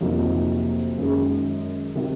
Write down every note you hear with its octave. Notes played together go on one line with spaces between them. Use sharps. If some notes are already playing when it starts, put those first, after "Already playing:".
F2 C3 F#3 A#3 D#4
F#2 D#3 G#3
C3 D#3 F#3